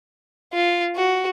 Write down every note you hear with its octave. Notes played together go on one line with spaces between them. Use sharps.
F4
F#4